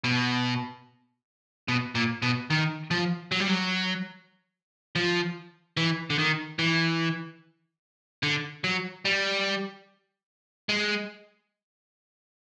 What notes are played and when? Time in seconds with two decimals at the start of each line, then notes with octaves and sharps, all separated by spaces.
0.04 B2
1.68 B2
1.95 A#2
2.22 B2
2.50 D#3
2.91 F3
3.32 F#3
3.40 G3
3.49 F#3
4.96 F3
5.77 E3
6.10 D3
6.19 D#3
6.59 E3
8.23 D3
8.64 F#3
9.05 G3
10.69 G#3